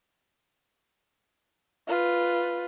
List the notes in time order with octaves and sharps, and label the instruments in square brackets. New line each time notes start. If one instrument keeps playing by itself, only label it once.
[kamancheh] F4 B4